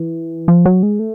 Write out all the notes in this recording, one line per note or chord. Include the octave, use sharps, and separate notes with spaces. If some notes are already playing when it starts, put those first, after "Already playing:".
Already playing: E3
F3
F#3
G#3
A3